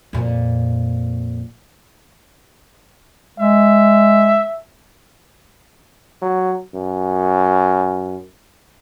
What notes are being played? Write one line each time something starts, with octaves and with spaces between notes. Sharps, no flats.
F2 A#2
G#3 E5
F#3
F#2